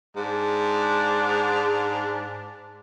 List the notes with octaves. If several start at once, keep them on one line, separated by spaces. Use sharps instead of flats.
G#2 D4